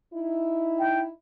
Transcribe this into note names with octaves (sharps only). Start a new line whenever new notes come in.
D#4 E4
G5